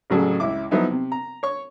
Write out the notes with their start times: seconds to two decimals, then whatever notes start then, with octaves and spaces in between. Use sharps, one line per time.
0.10 A1 A2 C#3 F#3 G#4 A4
0.40 C#2 E4 D6
0.71 F3 F#3 B3 D#4 E4
0.90 C3
1.12 A#5
1.43 C#5 C#6